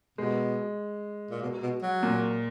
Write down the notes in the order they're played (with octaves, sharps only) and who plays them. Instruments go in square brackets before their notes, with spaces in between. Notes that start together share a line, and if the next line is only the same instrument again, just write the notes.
[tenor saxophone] B2 [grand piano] G#3
[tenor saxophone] A#2
B2
B2
F#3
[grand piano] A#2